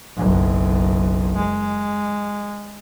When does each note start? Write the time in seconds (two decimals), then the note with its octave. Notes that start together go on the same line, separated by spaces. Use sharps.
0.16 F#1 B1
1.36 G#3